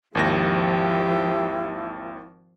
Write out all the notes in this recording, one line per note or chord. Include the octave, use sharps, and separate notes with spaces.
G#1 D#2 F3 E4 G4 A#6